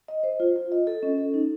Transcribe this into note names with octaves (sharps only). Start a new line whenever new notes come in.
D#5
C5
F4
F4
D#5
A4
C#4
A4
D#4